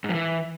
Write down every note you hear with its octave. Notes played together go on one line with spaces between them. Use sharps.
G#2
F3
E3